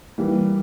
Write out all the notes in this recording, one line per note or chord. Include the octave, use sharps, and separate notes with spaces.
E3 G3 A#3